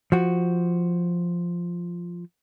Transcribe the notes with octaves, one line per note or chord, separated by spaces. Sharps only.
F3 F#4